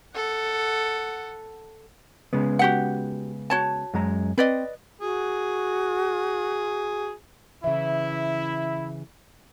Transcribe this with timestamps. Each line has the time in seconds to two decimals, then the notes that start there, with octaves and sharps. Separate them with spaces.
0.15 A4 F#5
2.33 C#3 G#3 B3
2.59 F#4 G4 F#5
3.50 F#4 C#5 A5
3.94 F#2 G#3 A#5
4.38 C4 B4 D5 D#5
5.01 F#4 G#4
7.64 C#3 E3 E4 E5